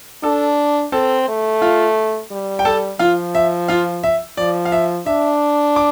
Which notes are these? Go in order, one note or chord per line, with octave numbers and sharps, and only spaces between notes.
D4 A4 A5
C4 A4 A5
A3
F4 F5
G3
G5
A4 A5
F3 F4 F5
E5
F4 F5
E5
F3 D5
F5
E5
D4 E5
D6